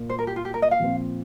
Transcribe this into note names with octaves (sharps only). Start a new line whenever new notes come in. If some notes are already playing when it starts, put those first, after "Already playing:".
Already playing: A#2 A#3
C5
A#4
G4
F4
G4
A#4
D#5
F5
A#2 F3 C4